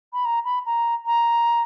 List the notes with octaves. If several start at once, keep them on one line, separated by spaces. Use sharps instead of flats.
B5
A#5
B5
A#5
A#5